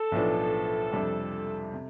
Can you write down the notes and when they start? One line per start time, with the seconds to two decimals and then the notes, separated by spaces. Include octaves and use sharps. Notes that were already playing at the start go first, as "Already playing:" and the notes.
Already playing: A4
0.12 B1 A2 F3 B3 D4
0.92 F2 C3 G3 D4
1.74 C3